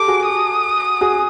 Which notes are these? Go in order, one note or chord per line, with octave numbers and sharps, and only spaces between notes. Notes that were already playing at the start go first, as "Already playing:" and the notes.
Already playing: G4 A4 D6
F#4 G#4
D#6
F#4 G#4